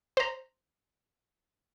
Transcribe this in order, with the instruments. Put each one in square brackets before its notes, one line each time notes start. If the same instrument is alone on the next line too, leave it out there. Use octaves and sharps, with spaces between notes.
[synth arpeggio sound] C5 A#5